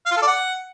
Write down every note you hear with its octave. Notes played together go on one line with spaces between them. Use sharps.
F5
F4
A4
D5
F#5